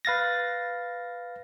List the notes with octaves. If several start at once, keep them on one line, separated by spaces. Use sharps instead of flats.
B4 F5 A6 A#6